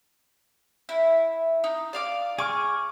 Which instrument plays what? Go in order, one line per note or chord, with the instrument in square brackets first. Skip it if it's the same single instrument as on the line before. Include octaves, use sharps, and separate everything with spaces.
[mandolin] E4
D#4
D5 F5 D6
[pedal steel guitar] G#4 C#6 F6 [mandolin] D6